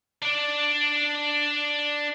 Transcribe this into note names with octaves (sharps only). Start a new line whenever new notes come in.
D4 D5